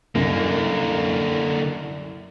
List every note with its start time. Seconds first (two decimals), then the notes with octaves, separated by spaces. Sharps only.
0.15 C2 F#2 D3 A#3